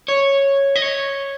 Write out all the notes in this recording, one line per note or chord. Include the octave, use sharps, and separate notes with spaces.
C#5
D#5
C#5